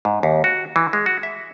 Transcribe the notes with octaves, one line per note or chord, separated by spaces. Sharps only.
G#2
D#2
F#4
E3
G#3
F#4
E5